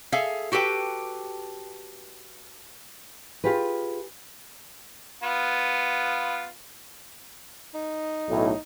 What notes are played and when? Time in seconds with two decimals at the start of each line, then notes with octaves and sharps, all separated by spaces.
0.12 G#4 A4 E5 F5
0.52 F#4 G4 A4 B4 G5
3.44 F4 G4 G#4 B4
5.23 B3 F4
7.74 D#4
8.29 B1 A2